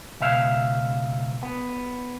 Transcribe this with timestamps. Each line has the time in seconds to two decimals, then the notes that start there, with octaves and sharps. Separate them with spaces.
0.20 C#2 B2 E5 F5
1.43 B3